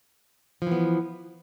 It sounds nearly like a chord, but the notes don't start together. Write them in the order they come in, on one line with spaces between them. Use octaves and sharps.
F3 E3 B3